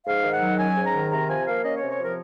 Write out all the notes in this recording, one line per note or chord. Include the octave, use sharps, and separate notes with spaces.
G#2 F5
D#3
F#5
F#3
C#4 G#5
G#2
A#5
D#3
C3 A#5
F3 G#5
A#3 F5
C#4 D#5
C#5
C3
C#5
F3 A#4